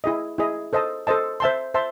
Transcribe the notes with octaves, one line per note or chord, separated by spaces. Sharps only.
E4 G#4 D#5
E4 G#4 D#5
A4 C5 D#5 A5
A4 C5 D#5 A5
C5 E5 A5 C6
C5 E5 A5 C6